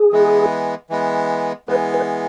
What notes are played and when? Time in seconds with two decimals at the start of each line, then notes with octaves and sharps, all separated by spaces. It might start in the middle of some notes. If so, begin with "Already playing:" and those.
Already playing: G#4
0.12 E3 G#3 B3
0.90 E3 G#3 B3
1.68 E3 G#3 B3 B4
1.94 B4